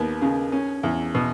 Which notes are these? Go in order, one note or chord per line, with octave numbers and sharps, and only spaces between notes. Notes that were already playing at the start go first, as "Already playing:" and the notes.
Already playing: D#2 B3
C#3
C#4
E2
B2